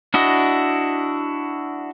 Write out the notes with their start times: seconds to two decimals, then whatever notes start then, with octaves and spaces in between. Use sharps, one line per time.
0.14 D4 E4 F#4 D#5